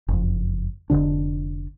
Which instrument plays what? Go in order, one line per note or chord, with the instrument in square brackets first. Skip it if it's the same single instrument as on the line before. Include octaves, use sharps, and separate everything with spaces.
[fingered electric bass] F#1 F2
F1 C2 D3 D4